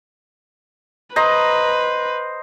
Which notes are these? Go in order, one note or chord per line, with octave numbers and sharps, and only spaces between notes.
B4 C5 D#5 A#5